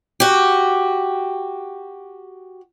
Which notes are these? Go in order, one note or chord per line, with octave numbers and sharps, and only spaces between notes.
F#4 G4